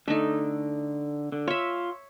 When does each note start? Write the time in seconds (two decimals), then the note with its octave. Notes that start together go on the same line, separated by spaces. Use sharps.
0.08 D3 A3 D#4
1.32 D3
1.48 F4 C#5 E5